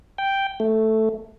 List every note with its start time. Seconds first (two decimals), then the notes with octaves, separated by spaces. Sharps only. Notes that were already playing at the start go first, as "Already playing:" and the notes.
0.18 G5
0.60 A3